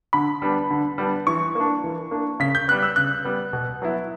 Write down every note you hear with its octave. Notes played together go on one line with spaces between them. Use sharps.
D3 B5
G3 B3 D4
D3
G3 B3 D4
E3 C#6
A#3 D4
E3
A#3 D4
C#3 B6
G6
G3 B3 F#6
E6
C#3 F#6
G3 B3
B2
F#3 B3 E4